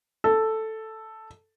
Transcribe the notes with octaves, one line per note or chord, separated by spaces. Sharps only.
A4